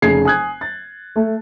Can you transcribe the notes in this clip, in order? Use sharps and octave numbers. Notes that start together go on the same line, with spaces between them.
F1 C#3 G#4 G#6 C7
G#5 D#6 F#6 G#6
A6
A3